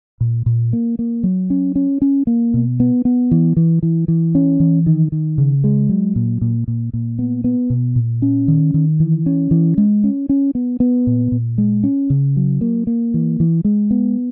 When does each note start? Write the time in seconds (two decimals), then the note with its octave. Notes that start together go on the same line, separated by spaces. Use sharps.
0.21 A#2
0.46 A#2
0.73 A#3
0.99 A#3
1.23 F#3
1.50 C#4
1.76 C#4
2.02 C#4
2.27 A#3
2.54 B2
2.80 B3
3.05 B3
3.31 E3
3.57 E3
3.83 E3
4.08 E3
4.35 C#4
4.60 E3
4.86 D#3
5.12 D#3
5.38 C#3
5.64 G#3
5.89 F#3
6.16 A#2
6.41 A#2
6.68 A#2
6.93 A#2
7.19 B3
7.44 B3
7.70 B2
7.96 A#2
8.22 C#4
8.48 D#3
8.74 D#3
9.00 E3
9.26 C#4
9.51 E3
9.78 G#3
10.04 C#4
10.29 C#4
10.55 B3
10.80 B3
11.07 A#2
11.32 A#2
11.58 G#3
11.84 C#4
12.10 C#3
12.36 F#3
12.61 A#3
12.87 A#3
13.14 E3
13.40 E3
13.65 G#3
13.91 B3